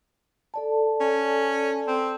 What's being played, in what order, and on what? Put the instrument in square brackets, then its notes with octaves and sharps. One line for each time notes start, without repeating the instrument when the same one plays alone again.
[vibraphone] A4 D5 A5
[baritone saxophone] C#4
C4